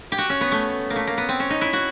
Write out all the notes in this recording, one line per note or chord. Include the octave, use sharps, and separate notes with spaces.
G4
F#4
C#4
B3
A3
A#3
A3
A#3
B3
C4
C#4
D#4
E4
F#4